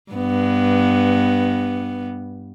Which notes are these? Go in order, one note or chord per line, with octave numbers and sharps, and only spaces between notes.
G2 B3